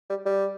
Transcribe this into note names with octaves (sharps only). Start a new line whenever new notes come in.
G3
G3